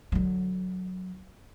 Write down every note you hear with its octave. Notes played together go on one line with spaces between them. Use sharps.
D3 F#3